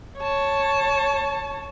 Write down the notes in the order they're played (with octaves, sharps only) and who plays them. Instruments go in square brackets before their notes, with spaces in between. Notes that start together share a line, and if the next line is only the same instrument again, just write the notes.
[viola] C#5 A5